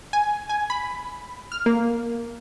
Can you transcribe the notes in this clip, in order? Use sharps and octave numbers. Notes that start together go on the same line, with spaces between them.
G#5
G#5
B5
F6
A#3